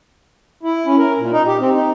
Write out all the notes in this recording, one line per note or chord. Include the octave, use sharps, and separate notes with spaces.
E4
C#4
A#4
A#2
D#4
G4
C4
D#4